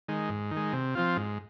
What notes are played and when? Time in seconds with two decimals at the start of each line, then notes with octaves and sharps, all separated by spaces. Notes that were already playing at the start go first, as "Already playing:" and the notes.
0.08 D#3 G#3
0.29 G#2
0.51 D#3
0.57 G#3
0.73 C3
0.95 F3 C4 F4
1.17 G#2